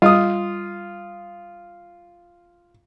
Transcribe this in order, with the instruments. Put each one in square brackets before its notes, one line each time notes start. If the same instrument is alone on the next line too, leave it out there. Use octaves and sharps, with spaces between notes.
[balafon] G3 [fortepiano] F4 D#6